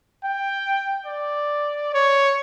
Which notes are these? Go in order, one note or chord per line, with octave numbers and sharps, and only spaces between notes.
G5
D5
C#5